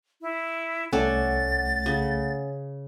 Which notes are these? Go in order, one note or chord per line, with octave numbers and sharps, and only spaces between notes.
E4
C2 A3 C#4 A4 D5 F#5 A6
C#3